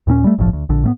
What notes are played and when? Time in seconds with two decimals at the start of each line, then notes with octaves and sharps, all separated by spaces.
0.07 D#2 A#2 C4 C#4
0.24 G3 A3
0.38 G1 C2 A2 F3
0.53 D2
0.69 A#1 D3
0.84 A2 A3 B3